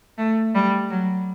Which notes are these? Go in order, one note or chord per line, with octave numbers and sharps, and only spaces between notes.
A3
G3
F#3